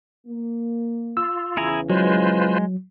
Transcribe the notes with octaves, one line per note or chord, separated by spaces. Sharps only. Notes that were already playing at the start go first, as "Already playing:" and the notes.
A#3
F4 E6
E2 C#3 E3 E4 G#4 A#5
F#3 G#3 F4 B4 C5